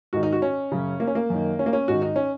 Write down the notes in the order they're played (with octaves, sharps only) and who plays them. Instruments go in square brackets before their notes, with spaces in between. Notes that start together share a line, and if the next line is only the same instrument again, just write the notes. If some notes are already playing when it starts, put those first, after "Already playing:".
[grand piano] G#2 D#3 F#4
D#4
F#4
C#4
F#2 C#3
A#3
C#4
A#3
F#2 D#3
C#4
A#3
C#4
G#2 D#3 F#4
D#4
C#4